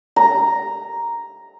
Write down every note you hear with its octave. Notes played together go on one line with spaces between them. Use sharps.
A#5